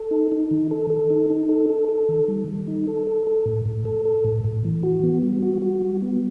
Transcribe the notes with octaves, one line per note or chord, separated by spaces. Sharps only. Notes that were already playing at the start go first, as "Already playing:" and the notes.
Already playing: A4
D#4
D#4
D#3
A4
A4
D#4
D#4
A4
A4
A4
D#3
G3
G3
D#4
A4
A4
A4
A2
A2
A4
A4
A2
A2
E3
F#4
B3
G3
F#4
F#4
G3
B3